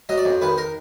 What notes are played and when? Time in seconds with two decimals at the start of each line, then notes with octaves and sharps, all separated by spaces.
0.09 F#3 D#5
0.18 D5
0.25 F2
0.42 D#3 B4
0.58 A#4